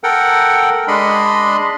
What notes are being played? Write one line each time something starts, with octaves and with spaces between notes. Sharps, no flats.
A4 A#4 F#5 G5
G#3 D4 D#5 B5 C6